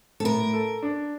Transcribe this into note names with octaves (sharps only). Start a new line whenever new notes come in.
A4
A2 A#4
A4
D4